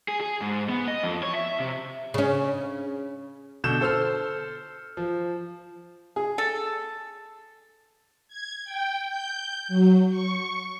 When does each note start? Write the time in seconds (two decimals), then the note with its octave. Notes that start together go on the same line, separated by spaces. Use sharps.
0.08 G#4
0.21 G#4
0.41 G#2
0.69 B3
0.88 D#5
1.03 F2
1.23 C#5
1.35 E5
1.60 C3
2.14 C#3 C#4
3.64 B2 D3 G6 E7
3.81 A4 C5 E6 F6
4.97 F3
6.16 G#4
6.38 A4
8.28 G#6
8.64 G5
9.08 G6
9.68 F#3
10.10 C#6